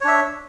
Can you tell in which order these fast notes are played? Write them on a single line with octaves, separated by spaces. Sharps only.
C#5 D4 E5